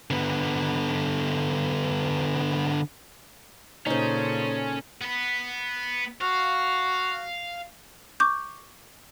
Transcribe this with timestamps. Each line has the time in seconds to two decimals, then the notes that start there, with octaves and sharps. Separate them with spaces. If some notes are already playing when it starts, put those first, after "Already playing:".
0.11 D3 B3
3.87 A#2 C#3 C#4 D#4 A4 C5
5.01 B3 B4
6.21 F#4 F5
8.20 C#6 D6 G6